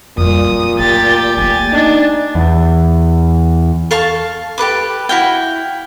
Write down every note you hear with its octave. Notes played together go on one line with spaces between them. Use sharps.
F2 A#2 G3 D#6
F#3
A3 G4 A6
A3 A#3 G#5 A6
D4 D#4
E2
A4 F5 A5 C#6
G4 A4 B4 D6
E4 F#4 F5 G5